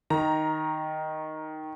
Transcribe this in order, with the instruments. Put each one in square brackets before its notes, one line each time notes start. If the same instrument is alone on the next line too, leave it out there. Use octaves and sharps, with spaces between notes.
[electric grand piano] D#3 [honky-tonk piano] A#5